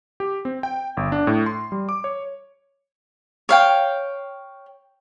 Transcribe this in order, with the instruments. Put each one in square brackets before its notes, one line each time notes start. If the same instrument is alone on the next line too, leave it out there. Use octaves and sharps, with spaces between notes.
[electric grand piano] G4
C4
G5
G1
D4
A2
C6
G3
D6
C#5
[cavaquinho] C#5 F5 G5